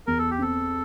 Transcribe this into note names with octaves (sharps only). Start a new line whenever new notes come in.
E2 A#4
A4
G4
C4 A4